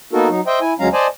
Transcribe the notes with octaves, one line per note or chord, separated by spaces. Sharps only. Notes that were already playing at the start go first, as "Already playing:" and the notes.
A#3 B3 D#4 F#4 A4 A#4
F#3 D#4
C5 D#5 E5 G5
E4 G#5
D2 F#3 G#3 C#4 F5 A#5
C5 D5 D#5 G#5 A5